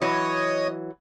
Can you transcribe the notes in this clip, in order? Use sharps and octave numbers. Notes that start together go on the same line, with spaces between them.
E3 F#3 C#5 D#5 D#6